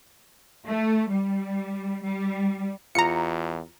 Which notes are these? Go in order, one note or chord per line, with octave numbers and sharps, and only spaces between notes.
A3
G3
G3
E2 F4 A#5 C#7